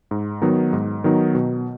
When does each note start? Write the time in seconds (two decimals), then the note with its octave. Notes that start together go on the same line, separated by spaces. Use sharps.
0.11 G#2
0.42 D#3 F#3 B3 D#4
0.73 G#2
1.04 D#3 F#3 B3 D#4
1.35 B2